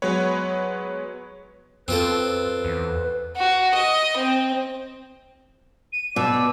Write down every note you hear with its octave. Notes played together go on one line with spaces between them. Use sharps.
F#3 G#3 B3 B4 C#5
F2 C4 F4 A4 B4
E2
F#4
D#5
C4
D#7
B2 D5 E6